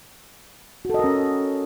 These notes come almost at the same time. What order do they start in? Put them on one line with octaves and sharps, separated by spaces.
F#4 A4 D#5 A#4 C#4